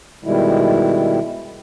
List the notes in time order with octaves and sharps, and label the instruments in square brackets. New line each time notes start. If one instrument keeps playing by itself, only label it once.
[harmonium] B2 D#3 G3 G#3 E4